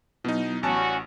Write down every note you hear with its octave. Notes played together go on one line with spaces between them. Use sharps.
B2 F#3 B3 D#4 E4
A1 G3 C#4 F#4 A5